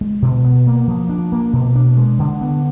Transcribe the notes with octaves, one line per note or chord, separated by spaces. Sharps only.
G#3
B2
B3
A#3
F3
D4
A#3
B2
D4
G#3
D3
B3